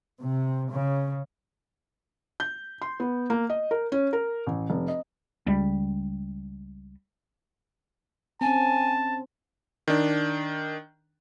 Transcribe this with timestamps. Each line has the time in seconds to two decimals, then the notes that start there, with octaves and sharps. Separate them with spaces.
0.21 C3
0.71 C#3
2.40 G6
2.82 C6
3.00 B3
3.30 A#3
3.50 D#5
3.71 A#4
3.92 C#4
4.13 A#4
4.46 A1
4.70 F1
4.88 D#5
5.47 C#2 G3
8.41 C4 C#4 G#5 A5
9.88 D#3 D4